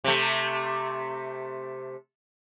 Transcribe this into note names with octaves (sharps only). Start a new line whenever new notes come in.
C3 A3